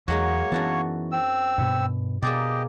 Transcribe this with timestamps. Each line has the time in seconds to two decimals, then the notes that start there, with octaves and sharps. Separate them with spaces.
0.08 E2 F#3 G#3 A#3 D#4 C#5 C#6
0.52 F#2 E3 B3 F#4 A5
1.12 C4 E6
1.58 G2 B2
2.22 B2 A#3 G4 G#4 D5 D#5 G5